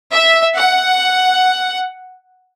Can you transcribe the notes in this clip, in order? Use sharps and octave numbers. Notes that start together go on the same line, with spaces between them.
E5
F#5